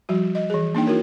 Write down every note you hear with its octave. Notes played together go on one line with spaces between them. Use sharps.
F3 G3 F#4
D#5
E3 G#4
A#3 D4 D#4 G5
E4 F#4 A#4 C#5